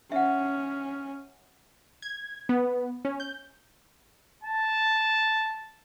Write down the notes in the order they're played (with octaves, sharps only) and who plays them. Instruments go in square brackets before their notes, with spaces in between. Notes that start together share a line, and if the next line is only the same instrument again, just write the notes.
[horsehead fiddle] C#4 [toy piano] E5 F#5
[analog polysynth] G#6
B3
C#4
G6
[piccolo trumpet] A5